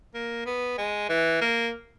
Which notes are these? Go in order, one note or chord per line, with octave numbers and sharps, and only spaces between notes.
A#3
B3
G#3
E3
A#3